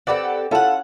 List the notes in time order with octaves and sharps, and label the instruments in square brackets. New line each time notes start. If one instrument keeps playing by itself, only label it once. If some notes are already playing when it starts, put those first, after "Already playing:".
[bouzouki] C4 G4 A4 [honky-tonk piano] B4 D5 F#5
[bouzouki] C#4 F#5 [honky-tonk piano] E4 F4 A4